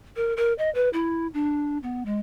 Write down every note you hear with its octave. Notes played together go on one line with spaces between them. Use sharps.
A#4
A#4
D#5
B4
E4
D4
B3
G#3